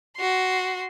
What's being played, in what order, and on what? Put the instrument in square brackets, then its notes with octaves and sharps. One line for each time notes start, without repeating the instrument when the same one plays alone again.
[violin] F#4 C6